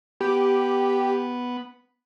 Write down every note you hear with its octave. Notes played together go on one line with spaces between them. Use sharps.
B3 G4